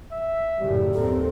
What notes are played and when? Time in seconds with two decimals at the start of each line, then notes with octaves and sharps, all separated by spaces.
0.12 E5
0.60 F#2 A2 C#3 G3
0.94 D#2 C4 A4 A#4